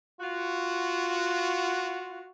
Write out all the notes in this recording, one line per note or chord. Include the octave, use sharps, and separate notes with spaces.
F4 F#4